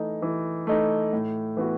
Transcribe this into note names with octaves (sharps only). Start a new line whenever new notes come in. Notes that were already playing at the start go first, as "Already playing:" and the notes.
Already playing: E3 A3 D#4
E3
A3 D#4
A2
E3 B3 F#4